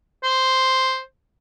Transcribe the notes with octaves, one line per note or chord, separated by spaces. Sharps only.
C5